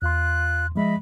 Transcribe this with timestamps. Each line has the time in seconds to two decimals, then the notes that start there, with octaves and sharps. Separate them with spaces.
0.02 E2 F4 C6 F#6
0.76 F3 G#3 D#5 E5 B5